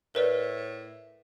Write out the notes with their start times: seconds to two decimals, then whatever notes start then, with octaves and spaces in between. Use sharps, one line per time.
0.15 A2 A#4 B4 D5